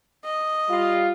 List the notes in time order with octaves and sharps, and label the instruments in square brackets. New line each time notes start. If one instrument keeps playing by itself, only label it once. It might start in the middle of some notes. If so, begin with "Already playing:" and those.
[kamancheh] D#5
[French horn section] G3 F4